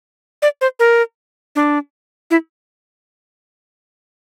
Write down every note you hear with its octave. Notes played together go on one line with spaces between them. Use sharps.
D5
C5
A#4
D4
E4